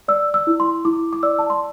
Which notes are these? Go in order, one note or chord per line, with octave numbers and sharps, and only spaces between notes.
D5 E6
E6
E4
C6
E4 D6
D6
D5 E6
A5
C6